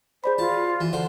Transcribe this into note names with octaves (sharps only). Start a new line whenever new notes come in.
G#4 C5 D5 B5
F4 F#4 C5 A5
E3 F#4
D3 C5